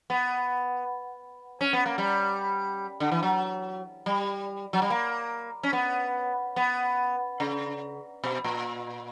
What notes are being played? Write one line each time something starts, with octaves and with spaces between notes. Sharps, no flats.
B3
C#4
B3
A#3
G3
D3
E3
F#3
G3
F#3
G3
A#3
C#4
B3
B3
C#3
B2
A#2